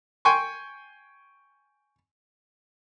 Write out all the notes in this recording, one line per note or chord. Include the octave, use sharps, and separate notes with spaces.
G5 G#5 C6 C#6